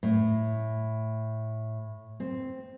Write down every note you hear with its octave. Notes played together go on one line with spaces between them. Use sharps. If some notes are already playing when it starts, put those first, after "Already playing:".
A2
C4